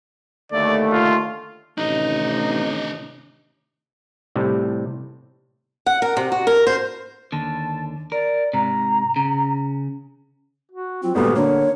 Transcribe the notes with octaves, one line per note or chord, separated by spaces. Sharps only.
D#2 D3 A3 D5
F4
A1 A2 C3 D#3 D4 D#4 D#5
A2 C3 G3
F#5
A#4
C3
F#4
A#4
C5
D#2 D3 A5
A#4 D5
G#2 C3 A#5
C#3
F#4
F#3 C4 F4
G#1 G2 A#2 B3 F#4 A4
D3 A#3 D4 C#5